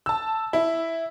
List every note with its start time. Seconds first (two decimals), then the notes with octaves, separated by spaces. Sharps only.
0.06 A5 E6
0.53 E4